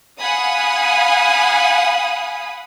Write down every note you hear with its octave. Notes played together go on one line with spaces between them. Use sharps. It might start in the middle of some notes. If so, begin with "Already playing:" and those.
F5 F#5 G#5 B5 D#6